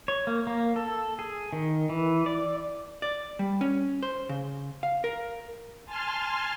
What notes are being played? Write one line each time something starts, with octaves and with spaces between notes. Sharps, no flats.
C#5
A#3
A#3
A4
G#4
D#3
E3
D5
D5
G3
C#4
C5
C#3
F5
A#4
G#5 A5 C6 F6